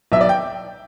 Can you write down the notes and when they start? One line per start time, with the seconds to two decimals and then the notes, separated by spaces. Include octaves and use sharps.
0.12 B1 E5
0.21 D5
0.29 G5